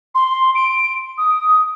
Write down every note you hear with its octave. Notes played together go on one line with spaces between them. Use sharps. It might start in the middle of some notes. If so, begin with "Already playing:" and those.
C6
D7
D#6